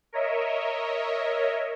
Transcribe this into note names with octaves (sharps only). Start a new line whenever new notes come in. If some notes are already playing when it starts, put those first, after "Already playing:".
A#4 C#5 D#5 E5